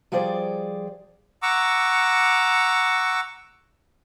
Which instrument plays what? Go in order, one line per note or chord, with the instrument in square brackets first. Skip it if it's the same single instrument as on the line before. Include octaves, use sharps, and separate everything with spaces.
[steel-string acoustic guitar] F3 G3 G#4 C5 D5
[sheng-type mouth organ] F#5 A#5 C#6 D6 E6